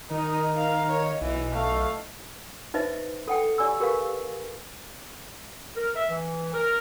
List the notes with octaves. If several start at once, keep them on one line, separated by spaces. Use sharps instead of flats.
D#3 D#4 A#4 D#5
F5
C#5
B1 E3
A3 F5
D#4 B4 C5 D#5 E5
A4 F#5 G5
G4 D5 G#5 E6
G4 A#4 B4 F5
A#4
E5
E3
A#4